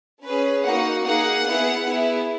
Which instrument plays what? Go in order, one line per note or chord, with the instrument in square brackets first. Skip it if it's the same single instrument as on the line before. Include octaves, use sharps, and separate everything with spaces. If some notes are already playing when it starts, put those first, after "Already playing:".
[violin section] C#4 G#4 B4
A#3 D#4 F#4 F#5
A#3 D#4 G#4 F#5
B3 E4 G#4
B3 E4 G#4